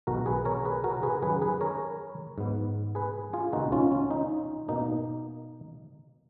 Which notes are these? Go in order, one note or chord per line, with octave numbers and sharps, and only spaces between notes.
B1 B2 G#3 B3 F#4 A#4
G#4 B4
A#4 C#5
G#4 B4
F#4 A#4
G#4 B4
F#2 D#3 F#3 G#4 B4
G#4 B4
A#4 C#5
G#2 F#3 B3
G#4 B4
F4 G#4
C#2 B2 A#3 D#4 F#4
C#4 F4
C#4
D#4
B2 A#3 D#4